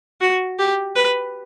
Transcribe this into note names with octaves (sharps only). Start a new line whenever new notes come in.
F#4
G4
B4